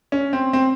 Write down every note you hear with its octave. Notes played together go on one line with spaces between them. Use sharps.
C#4
C4
C4